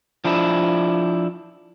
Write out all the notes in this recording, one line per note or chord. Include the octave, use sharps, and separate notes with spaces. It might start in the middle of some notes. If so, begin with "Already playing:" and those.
F3 D4 E4